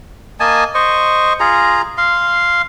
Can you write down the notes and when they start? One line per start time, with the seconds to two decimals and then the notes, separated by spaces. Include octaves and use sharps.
0.40 A#3 D#5 G#5 A5
0.75 C5 D#5 C#6
1.40 F4 G#4 A#5
1.98 F5 C6